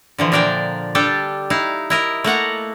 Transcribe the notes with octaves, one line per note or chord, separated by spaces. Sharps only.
D3 E3 F3
A#2 D4 A#4 D5 G5
G3 D4 G4 A4
D#4 E4 F5
E4 A#4 D#5
A3 A#3 F#5 A#5